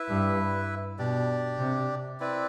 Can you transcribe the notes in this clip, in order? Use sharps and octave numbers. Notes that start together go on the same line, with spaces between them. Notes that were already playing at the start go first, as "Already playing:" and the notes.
Already playing: E4 B4 E5
G2
B2 D4 G4 D5
C3
C4 E4 B4 D5